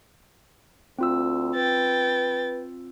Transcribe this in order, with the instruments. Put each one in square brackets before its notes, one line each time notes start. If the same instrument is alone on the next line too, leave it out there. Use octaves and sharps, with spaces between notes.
[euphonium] D2 [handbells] C4 F4 E6
[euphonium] B4 [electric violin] G5 A6